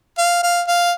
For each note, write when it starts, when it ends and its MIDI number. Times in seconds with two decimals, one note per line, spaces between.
0.18 0.41 77
0.43 0.62 77
0.67 0.92 77